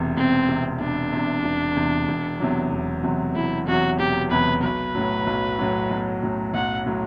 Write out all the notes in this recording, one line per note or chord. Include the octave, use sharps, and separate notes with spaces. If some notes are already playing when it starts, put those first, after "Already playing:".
Already playing: E1 E2 C3
E1 C4
E2 C3
E1 D4
E2 C3
E1
E2 C3
E1
E2 C3 F#3
E1
E2 C3 F#3
E1 E4
E2 C3 F#3 F#4
E1 G4
E2 C3 F#3 B4
B1 B4
A2 F#3
B1
A2 F#3
B1
A2 F#3
B1 F#5
A2 F#3